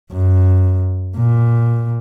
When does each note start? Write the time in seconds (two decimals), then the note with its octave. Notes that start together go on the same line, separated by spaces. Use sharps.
0.12 F#2
1.17 A#2